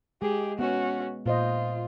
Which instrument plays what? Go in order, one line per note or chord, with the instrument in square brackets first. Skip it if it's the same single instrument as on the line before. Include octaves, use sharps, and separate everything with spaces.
[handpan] G#3 [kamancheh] G4 G#4
[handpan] B3 [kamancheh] C#4 F#4
[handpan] A#2 C5 D#5 [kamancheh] F4